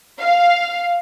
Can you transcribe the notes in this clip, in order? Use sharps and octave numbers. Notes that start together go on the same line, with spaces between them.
F5